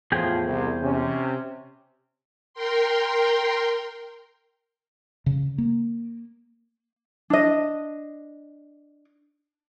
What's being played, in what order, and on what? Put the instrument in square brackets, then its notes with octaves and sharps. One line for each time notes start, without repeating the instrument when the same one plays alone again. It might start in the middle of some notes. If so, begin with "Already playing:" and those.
[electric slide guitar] E2 G#4 G5 [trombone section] A2 F3
[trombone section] C2
C3 C#4
[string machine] A#4 G5 C6
[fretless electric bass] C#3
A#3
[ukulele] D4 D#5